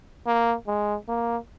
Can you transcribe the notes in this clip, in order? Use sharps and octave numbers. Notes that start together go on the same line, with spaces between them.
A#3
G#3
A#3